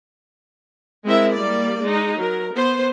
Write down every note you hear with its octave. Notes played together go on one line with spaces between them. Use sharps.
G#3 C4 E4 A#4 E5
G3 A#3 D5
G#3 D#4
F#3 A#4
B3 C5